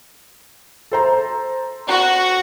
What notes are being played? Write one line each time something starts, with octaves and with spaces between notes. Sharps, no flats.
A4 C5 A#5
F#4